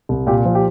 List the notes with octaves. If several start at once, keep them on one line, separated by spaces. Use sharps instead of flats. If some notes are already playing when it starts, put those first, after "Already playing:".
C2
A#2 G4
F3
G4